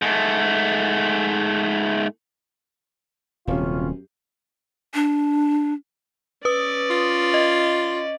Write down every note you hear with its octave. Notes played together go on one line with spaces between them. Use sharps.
G#2 A3
D#1 F#2 C3 C#4 F4
D4
C#4 B4 D5 D#6
F4
D#5